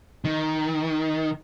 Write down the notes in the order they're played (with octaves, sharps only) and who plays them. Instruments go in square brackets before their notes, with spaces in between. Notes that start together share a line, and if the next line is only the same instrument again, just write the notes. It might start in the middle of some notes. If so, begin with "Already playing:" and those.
[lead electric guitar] D#3